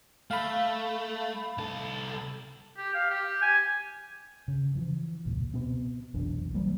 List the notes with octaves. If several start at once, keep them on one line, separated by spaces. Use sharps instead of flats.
A3 F5 B5
C2 A4
G4
F5
G4
G#5
C#3
E3 F3
E1 C#2 A#2
B2 B3 C4
F1 B1 E3 D4
E3 F#3 G3 A#3